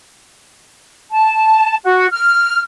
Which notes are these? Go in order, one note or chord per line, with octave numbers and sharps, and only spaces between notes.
A5
F#4
F6